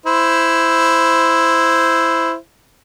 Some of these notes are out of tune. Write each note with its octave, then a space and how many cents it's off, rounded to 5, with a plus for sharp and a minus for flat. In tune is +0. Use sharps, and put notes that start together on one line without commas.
E4 +0 C5 -10